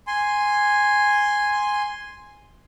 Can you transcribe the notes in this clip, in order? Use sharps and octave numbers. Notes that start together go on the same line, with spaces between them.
G#5 C6